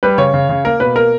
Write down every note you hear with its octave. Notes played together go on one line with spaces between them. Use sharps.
G3 B4
C#3 C#5
C#3
C#3
A#3 A#4
B2 B4
A#3 A#4